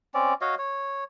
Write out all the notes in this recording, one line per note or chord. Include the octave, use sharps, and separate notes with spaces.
C4 C#4 D5
F#4 C#5 D#5 F5
C#5